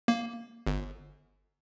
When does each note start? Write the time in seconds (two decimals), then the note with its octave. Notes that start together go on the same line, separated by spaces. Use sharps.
0.08 A#3
0.67 G1